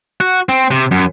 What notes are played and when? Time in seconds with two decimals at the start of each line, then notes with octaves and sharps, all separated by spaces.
0.20 F#4
0.49 C4
0.71 C3
0.91 F#2